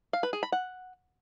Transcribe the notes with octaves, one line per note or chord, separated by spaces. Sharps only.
F5
B4
G#4
B5
F#5